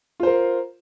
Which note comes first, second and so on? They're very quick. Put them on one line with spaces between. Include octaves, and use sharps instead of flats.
F4 C5 A#4